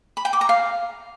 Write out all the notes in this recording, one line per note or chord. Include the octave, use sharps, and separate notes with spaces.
B5
G5
D6
A#5
F5